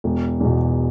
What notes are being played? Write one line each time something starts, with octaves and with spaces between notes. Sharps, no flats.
E1
E2 B2